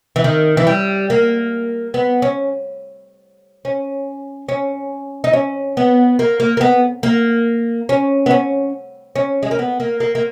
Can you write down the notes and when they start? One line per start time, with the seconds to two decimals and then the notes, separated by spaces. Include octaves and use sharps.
0.16 E3
0.24 D#3
0.57 E3
0.67 G3
1.10 A#3
1.94 B3
2.22 C#4
3.65 C#4
4.49 C#4
5.24 D#4
5.33 C#4
5.77 B3
6.19 A#3
6.40 A#3
6.57 A#3
6.61 B3
7.03 A#3
7.89 C#4
8.26 B3
8.31 C#4
9.16 C#4
9.43 G#3
9.51 A#3
9.59 B3
9.80 A#3
10.00 A#3
10.15 A#3